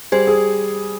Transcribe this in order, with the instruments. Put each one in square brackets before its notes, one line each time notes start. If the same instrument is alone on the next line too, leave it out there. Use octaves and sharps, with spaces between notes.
[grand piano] G3 [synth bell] G#4 C5
[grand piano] G#4